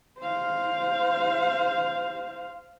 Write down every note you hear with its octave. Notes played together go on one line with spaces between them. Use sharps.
C5 F5